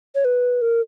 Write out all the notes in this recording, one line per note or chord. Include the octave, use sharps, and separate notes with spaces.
C#5
B4
A#4